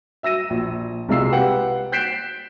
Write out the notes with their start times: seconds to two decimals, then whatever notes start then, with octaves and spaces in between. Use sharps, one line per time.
0.23 E5 E6 A#6 D#7
0.50 A#1
1.09 C2 C3 G#3 F4 E6 C7
1.31 G4 B4 F#5 G5
1.92 F#6 G6 B6 C7 D7 E7